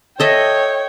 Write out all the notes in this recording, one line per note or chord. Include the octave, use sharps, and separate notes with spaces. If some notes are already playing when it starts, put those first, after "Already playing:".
A4 C#5 D#5 E5 G5